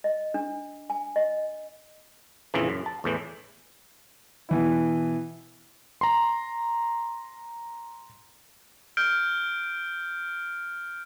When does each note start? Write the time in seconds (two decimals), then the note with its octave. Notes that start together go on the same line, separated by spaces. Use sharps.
0.04 D#5
0.34 D4
0.90 G#5
1.16 D#5
2.54 A#1 F2 C#3 E3
2.69 F#2
2.86 A5
3.04 E2 A2 E3
4.49 B2 E3 E4
6.01 A#5 C6
8.97 F6 G6 D7